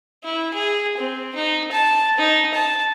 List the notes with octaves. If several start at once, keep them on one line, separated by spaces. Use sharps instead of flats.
E4
G#4
C4
D#4
A5
D#4
A5